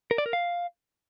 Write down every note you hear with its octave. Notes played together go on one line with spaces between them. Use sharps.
A#4
D5
A#4
F5